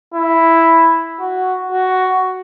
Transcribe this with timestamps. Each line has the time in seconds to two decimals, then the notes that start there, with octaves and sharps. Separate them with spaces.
0.14 E4
1.20 F#4
1.72 F#4